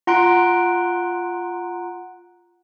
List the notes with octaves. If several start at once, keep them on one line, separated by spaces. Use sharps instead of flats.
F4 F#5 A#5 C6 F#6 D7